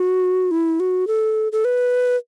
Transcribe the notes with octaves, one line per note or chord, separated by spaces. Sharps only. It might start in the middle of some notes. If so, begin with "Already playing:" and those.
Already playing: F#4
E4
F#4
A4
A4
B4